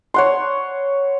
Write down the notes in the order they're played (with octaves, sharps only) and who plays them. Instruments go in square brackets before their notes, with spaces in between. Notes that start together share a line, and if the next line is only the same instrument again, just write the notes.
[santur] C#5 F#5 C6